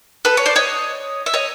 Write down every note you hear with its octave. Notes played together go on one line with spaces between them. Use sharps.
A4 B4
C#5
C5 D5
C#5 D#5
E5
C#5 D#5